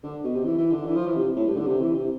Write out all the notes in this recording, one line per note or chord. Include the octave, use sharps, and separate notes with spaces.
D3
B2
C3
E3
E3
D3
E3
F3
E3
C3
A2
G2
D3
C3
E3
C3